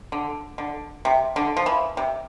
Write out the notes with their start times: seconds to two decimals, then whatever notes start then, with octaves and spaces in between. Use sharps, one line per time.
0.12 D3
0.58 D3
1.05 C3
1.36 D3
1.57 F3
1.66 E3
1.97 C3